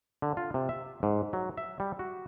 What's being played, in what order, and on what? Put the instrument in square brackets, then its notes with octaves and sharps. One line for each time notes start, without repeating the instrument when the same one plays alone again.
[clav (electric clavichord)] D3
F4
C3
E5
G#2
F#3
E5
G3
F#4